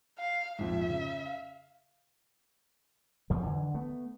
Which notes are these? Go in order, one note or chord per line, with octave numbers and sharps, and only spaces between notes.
F5
A#1 F2 G#2 E5
C#3
F5
A1 F2 F3
D3 E3
A3 B3